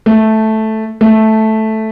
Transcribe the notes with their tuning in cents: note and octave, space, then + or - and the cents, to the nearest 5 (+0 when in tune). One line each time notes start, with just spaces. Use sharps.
A3 -5
A3 -5